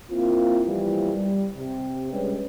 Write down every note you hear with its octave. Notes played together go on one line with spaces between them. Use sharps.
A#3 C4 E4 F4
E3 F3 G3 A#3 B3 E4
G3
C3
G3 G#3 C#4 D4 B4